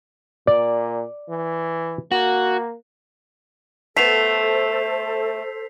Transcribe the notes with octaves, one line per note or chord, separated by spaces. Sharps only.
A#2 D5
E3
A#3 F#4
A3 B3 A4 C5 B6 C7 F7